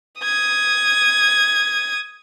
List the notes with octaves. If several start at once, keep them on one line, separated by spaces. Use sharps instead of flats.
D#6 G#6